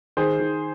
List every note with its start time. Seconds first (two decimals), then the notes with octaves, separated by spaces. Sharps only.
0.17 D#3 G#4 C5
0.40 D#3